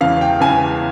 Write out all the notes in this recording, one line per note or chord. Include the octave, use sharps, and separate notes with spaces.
E1 E2 C#3 E3 F5
G5
E1 E2 C#3 E3 G#5